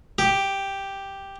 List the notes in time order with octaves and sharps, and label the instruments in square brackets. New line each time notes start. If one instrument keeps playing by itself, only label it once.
[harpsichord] G4